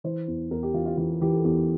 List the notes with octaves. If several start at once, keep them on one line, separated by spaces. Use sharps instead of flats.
E3 C5
E2
E2 A#4
G4
E3 F4
F4
E3 F4
G4
E3 G4
A4
E2 G4